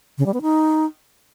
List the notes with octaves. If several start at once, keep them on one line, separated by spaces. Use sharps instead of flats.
C#3
G3
B3
D#4